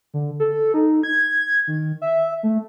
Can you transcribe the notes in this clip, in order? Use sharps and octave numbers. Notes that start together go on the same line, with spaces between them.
D3
A4
D#4
G#6
D#3
E5
A3